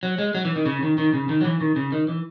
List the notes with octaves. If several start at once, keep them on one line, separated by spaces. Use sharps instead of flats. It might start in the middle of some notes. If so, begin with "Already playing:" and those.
F#3
G#3
F#3
E3
D#3
C#3
D#3
D#3
C#3
D#3
F#3
E3
D#3
C#3
D#3
E3